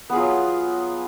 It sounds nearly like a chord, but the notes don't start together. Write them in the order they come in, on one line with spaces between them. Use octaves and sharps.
B3 G#4 F4 F#3